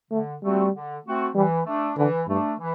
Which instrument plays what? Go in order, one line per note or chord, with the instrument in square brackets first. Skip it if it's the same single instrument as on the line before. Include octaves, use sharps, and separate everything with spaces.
[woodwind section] D3 [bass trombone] A3
[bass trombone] G3 [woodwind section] A3 C4 F#4
[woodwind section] D3
A3 C4 F#4
[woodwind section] E3 [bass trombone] G3
[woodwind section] A3 D4
[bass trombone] D3 [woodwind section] E3
[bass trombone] G2 [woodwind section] A3 D4
[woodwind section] E3